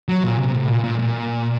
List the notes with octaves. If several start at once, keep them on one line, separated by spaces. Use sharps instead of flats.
F#3
A#2
C3
A2
A#2
A#2
A#2